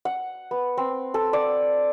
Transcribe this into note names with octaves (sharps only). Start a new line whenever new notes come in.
F#5
B3
C4
A4
D5